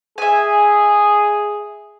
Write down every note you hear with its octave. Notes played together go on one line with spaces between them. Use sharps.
G#4 E5 G#5